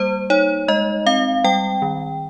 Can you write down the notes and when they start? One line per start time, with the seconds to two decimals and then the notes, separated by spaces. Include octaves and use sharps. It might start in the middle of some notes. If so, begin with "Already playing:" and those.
Already playing: G3 A#3 C5
0.30 D#4 C#5
0.68 G#3 D#5
1.06 C4 F5
1.44 G3 G5
1.82 D#3